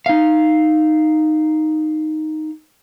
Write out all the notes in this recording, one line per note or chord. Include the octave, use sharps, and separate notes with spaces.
D#4 F5